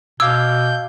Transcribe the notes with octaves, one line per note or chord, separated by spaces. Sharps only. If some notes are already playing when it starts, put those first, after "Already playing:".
B2 F5 D6 E6 G6 G#6